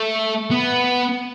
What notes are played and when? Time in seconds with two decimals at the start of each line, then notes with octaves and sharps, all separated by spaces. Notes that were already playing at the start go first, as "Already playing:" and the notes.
Already playing: A3
0.51 B3